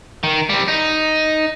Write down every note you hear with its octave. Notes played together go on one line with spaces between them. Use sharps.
D#3
G3 C4
D#4